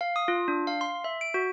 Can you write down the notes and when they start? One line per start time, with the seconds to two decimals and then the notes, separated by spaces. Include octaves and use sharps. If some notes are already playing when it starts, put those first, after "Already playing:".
0.01 F5
0.16 D#6
0.28 F4
0.48 D4
0.67 F5
0.81 C6
1.04 E5
1.21 D7
1.34 F#4